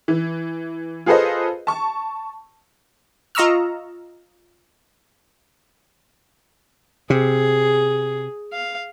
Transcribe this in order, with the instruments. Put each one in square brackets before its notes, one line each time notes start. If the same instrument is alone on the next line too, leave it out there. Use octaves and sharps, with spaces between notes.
[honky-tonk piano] E3
F4 G#4 A4 B4 C5 D#5
A5 C#6
[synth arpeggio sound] F4 D#5 A#5 C#6 E6 F6
[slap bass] C3 [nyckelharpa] G#4
[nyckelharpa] F5